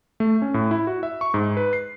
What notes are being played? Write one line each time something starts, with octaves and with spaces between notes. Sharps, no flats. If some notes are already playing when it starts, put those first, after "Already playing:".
A3
C#4
A2
E4
F#4
E5
C#6
G#2
B4
C7